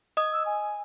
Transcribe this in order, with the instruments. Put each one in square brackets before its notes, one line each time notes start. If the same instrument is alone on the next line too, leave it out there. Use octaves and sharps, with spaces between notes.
[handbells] D#5 D#6
[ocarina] E6
G#5